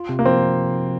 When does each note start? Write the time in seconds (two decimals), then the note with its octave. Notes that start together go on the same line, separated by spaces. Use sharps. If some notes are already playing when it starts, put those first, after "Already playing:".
Already playing: F4
0.09 C3
0.19 A#3
0.25 F3 C4